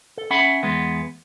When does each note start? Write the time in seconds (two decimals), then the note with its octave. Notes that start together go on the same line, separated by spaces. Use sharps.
0.18 A4
0.31 C#4 E5 F#5 B5
0.63 E2 G#3 B3